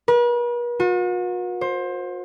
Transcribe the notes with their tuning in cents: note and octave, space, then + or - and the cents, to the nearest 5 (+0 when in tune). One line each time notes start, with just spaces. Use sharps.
B4 -45
F#4 -45
C5 +20